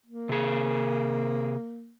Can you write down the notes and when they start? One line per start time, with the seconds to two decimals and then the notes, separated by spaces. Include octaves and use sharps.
0.06 A#3
0.29 C3 G#4